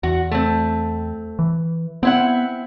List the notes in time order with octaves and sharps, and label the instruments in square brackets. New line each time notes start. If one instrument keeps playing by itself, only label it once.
[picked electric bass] E2 [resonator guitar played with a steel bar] F#4
[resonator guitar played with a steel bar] A3 C4
[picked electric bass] E3
[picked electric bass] B3 [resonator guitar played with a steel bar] C4 E4 F#5